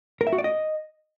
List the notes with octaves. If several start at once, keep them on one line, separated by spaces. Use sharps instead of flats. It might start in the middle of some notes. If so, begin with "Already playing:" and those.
A#4
E5
F#4
D5
D#5